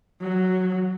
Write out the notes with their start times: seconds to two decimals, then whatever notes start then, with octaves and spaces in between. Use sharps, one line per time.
0.21 F#3